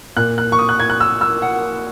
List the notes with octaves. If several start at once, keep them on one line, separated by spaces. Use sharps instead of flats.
A#2 F#6
F#6
C#6
D#6
F#6
G#6
F#6
E6
E6
F#5